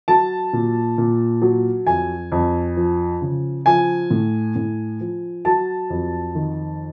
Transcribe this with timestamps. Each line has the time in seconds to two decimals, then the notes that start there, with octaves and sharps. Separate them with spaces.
0.08 F#3 A5
0.53 A#2
0.98 A#2
1.42 F#3
1.87 F2 G#5
2.32 F2
2.77 F3
3.21 C#3
3.66 F3 G#5
4.11 A2
4.56 A2
5.01 F3
5.45 F#3 A5
5.90 F2
6.35 D#3